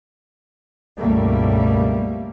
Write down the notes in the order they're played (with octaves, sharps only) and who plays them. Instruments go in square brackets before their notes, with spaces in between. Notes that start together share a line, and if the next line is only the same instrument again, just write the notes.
[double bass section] C#2 G2 B2 G3 A3 A#3